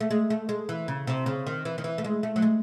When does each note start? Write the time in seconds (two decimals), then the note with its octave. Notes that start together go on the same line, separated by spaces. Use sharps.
0.01 A3
0.11 G#3
0.30 A3
0.49 G#3
0.69 E3
0.88 C#3
1.07 C3
1.26 C#3
1.47 D#3
1.65 E3
1.78 D#3
1.84 E3
1.98 A3
2.04 G#3
2.23 A3
2.36 F#3
2.42 G#3